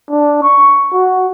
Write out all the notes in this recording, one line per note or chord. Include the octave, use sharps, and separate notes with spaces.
D4
C#6
F#4